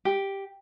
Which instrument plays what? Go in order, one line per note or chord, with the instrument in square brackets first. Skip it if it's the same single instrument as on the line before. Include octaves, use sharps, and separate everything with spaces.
[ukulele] G4